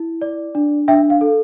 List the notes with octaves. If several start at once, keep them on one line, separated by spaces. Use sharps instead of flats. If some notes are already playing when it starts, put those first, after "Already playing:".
Already playing: E4
D5
D4
D4 E5 G5
F5
A4